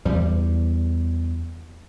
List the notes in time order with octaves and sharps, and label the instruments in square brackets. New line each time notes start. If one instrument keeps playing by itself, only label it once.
[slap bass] E2 G3